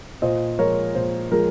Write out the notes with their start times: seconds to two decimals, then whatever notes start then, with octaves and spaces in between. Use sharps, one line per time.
0.22 A#2 C5 D#5
0.58 F3 G#3 A#4 C#5
0.95 A#2 C5
1.32 F3 G#3 A#4